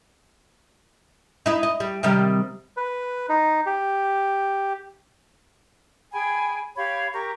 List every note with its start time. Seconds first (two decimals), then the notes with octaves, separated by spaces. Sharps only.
1.46 D#4 E4
1.63 D#5
1.80 G3
2.03 C3 D#3 G3
2.77 B4
3.29 D#4
3.66 G4
6.12 G#4 G5 G#5 B5
6.76 G4 C#5 F5 B5
7.13 G4 A#4 A#5 C#6